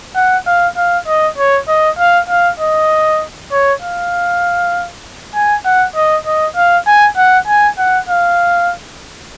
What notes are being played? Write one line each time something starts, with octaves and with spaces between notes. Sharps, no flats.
F#5
F5
F5
D#5
C#5
D#5
F5
F5
D#5
C#5
F5
G#5
F#5
D#5
D#5
F5
G#5
F#5
G#5
F#5
F5